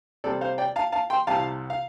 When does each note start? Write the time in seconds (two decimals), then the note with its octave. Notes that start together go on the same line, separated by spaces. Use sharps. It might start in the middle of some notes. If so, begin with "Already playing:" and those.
0.24 C3 G3 C4 A4 D5
0.41 C5 F5
0.58 D5 G5
0.76 F5 A5
0.92 F5 A5
1.10 G5 C6
1.27 C2 C3 G3 F5 A5
1.70 F5